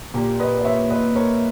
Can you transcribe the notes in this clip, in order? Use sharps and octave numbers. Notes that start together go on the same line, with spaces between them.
A#2 A#3 G4
B4 D#5
D#5
C#5 E5
B4 D#5
A#4 C#5